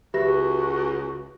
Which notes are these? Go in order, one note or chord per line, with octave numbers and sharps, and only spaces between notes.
C#2 F#4 G4 B4 E5 A#6